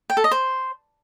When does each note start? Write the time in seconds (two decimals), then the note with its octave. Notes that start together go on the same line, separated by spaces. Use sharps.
0.10 G5
0.17 A4
0.24 D#5
0.31 C5